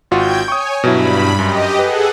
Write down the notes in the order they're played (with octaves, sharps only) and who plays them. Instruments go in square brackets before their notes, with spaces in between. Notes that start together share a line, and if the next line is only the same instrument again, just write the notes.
[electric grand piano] G#1 F4 F#4 [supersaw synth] G5 G6 G#6
[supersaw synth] C#5 G#5 [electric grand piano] C#6 D#6
[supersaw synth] G2 B5 [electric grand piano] B2 F#3 E4
[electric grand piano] F#2 [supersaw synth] G4 D#5
[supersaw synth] G#4 A4 F#5 [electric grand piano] B4